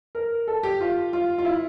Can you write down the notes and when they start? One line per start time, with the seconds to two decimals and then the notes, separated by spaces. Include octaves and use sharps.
0.15 A#4
0.48 A4
0.63 G4
0.80 F4
1.13 F4
1.38 F4
1.45 E4